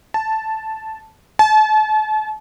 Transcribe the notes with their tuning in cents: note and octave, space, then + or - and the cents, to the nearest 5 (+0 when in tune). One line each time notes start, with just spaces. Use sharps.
A5 -5
A5 -40